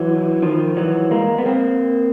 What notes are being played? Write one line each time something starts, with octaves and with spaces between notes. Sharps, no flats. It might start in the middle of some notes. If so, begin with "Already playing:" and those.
Already playing: E3 F#3
D#3 F3
E3 F#3
G#3 A#3
B3
A#3 C4